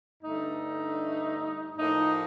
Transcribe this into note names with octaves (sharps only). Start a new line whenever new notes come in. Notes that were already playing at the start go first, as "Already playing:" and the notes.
G2 D3 A3 D#4
A2 F3 A#3 D#4